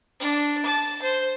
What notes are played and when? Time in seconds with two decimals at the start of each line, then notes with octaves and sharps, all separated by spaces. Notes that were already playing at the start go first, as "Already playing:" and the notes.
0.20 D4
0.65 A5
1.02 C5